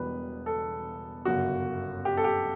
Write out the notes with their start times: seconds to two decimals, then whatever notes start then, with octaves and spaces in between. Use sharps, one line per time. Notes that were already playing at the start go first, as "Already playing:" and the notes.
Already playing: E1 E2 B2 G3 B3 B4
0.46 A4
1.25 G1 F#2 C#3 F#4
2.05 G4
2.17 A4
2.24 G4